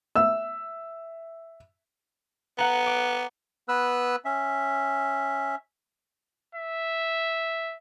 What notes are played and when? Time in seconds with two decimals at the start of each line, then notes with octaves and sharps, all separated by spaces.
0.15 E5 E6
2.58 B3 F#5 A#5
2.86 D6
3.68 B3 B4 E6 F#6
4.25 C#4 E5
6.55 E5